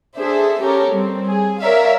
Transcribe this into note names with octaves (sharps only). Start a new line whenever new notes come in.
D4 G#4 A4 C5 E5
C#4 G4 A4 A#4 C#5
G3 C4
G#4
A#4 C#5 D5 E5 F5